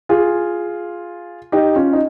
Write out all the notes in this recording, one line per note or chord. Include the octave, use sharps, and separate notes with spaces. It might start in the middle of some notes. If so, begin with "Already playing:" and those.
F4 G#4
D#4 G4
C#4 F4
D#4